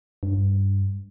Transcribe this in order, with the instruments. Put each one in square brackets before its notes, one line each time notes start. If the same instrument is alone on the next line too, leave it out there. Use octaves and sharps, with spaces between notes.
[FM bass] G2